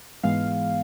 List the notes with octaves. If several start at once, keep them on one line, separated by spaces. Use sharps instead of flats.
G#2 E3 G#3 B3 F5